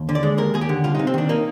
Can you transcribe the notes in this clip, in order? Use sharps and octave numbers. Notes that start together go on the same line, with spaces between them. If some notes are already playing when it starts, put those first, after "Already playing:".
Already playing: D#2
D3
D5
G#3
D#2 A#4
D#2 G#4
G4
D3
C2 F4
C3 D#4
C4
D#3 D4
A#3 D#4